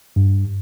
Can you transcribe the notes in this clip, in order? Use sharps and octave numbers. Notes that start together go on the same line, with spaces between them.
G2